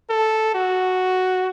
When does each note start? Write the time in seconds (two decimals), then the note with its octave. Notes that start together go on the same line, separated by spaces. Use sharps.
0.10 A4
0.55 F#4